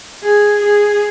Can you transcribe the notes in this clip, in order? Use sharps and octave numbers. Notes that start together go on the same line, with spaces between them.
G#4
G#4